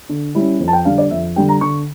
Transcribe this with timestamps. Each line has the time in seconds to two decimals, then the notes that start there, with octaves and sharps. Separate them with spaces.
0.09 D3
0.35 G3 C#4 E4
0.60 F2
0.68 A5
0.73 G5
0.85 D3 G3 D4 F5
0.98 D5
1.11 F2 E5
1.36 D3 G3 D4 G5
1.49 A#5
1.61 D3 C#6